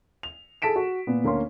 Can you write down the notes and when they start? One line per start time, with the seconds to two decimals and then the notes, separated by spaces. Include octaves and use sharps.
0.23 F7
0.62 G#4 A4 A5 B6 D7 E7
0.76 F#4
1.07 A#2 B3
1.24 D2 A#3 C#4 C6